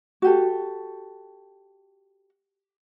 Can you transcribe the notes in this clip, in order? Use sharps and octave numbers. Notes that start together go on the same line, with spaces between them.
F#4 G4 A4